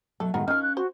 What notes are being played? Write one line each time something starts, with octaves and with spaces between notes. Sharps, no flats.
B2 F#3 A3 A4
A2 D#3 G#3 B3 F#4 A#4
F3 C#4 D#4 A#4 F5 F6
F#6
F#4 C5